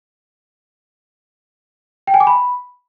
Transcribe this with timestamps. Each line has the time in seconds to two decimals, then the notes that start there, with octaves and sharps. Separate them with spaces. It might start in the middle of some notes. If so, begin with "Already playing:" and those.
2.07 G5
2.14 G#5
2.20 D6
2.27 B5